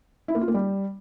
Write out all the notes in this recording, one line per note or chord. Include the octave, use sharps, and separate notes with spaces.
E4
A#3
F4
A#3
G3